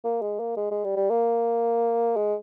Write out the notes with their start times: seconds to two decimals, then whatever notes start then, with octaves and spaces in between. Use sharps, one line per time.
0.04 A#3
0.22 G#3
0.40 A#3
0.57 G#3
0.71 G#3
0.84 G3
0.97 G3
1.10 A#3
2.16 G#3